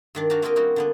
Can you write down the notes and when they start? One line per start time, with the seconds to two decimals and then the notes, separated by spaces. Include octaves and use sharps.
0.15 G2 D#3 D4
0.30 D4 F#4 G4 F5 A#5
0.42 A#3 C4 F4 G4 A#4 D#5
0.56 G3 C4 C#4 D#4 F#4
0.76 D3 A#3 B3